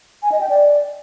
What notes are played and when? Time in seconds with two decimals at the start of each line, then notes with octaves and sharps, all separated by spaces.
0.23 G#5
0.32 D#5
0.41 G5
0.49 D5